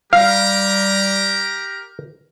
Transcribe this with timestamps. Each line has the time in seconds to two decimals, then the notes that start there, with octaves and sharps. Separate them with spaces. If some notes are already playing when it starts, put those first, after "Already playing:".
0.13 G3 G4 A#4 F5 A#5